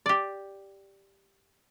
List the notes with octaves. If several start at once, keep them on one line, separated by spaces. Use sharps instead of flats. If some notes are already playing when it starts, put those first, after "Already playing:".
G4 D5